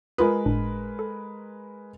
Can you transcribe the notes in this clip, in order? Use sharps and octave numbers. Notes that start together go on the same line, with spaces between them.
G#3 F4 A#4 B4 D#6
G1 A2 D4
A4